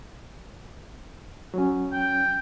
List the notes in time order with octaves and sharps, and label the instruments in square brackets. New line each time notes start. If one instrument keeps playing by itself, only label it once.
[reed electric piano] F#3 C#4
[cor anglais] G5